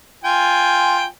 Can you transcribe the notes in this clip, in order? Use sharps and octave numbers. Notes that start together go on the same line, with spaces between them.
F4 G5 G#5